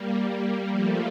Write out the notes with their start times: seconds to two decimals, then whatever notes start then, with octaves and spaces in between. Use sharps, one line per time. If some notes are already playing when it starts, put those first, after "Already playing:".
Already playing: G3 A#3
0.69 F3 A3